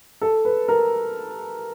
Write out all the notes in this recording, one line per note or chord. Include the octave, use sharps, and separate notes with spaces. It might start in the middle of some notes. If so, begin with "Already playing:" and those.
A4
B4
A#4